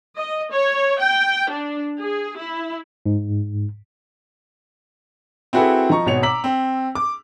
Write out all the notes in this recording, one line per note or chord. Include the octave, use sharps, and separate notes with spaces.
D#5
C#5
G5
D4
G#4
E4
G#2
C4 E4 F#4 G#4 A4 B4
F3 D#5 A#5 C#6
G#1 B2 C#5 C#7 F7
A#5 D6 E6 B6 F#7
C4
D6